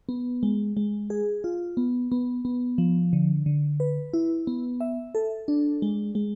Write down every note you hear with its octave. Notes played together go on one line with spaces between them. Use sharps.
B3
G#3
G#3
G#4
F4
B3
B3
B3
F3
D3
D3
B4
E4
B3
E5
A4
D4
G#3
G#3